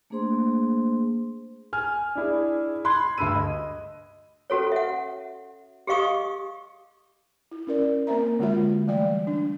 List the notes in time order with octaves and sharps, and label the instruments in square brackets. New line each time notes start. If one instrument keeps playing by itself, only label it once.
[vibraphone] A3 A#3 D4 G#4 C5 C6
[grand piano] G#5 F6
D4 E4 G#4
B5 C6 F#6 G#6
D2 G2 B5 E6 D#7
D#5
[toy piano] C#4 F#4 A4 C#5
E5 F#5
G4 G#4 D#5 F5 C#6 D#6
[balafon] E4
C#4 A#4 D5
A#3 C4 A#4 C5 E5 A#5
D3 G#3 F4 F#4 E5
E3 G3 A3 D5 G5
D4